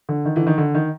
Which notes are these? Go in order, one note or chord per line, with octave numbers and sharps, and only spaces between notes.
D3
D#3
D3 E3
D#3
D3
D#3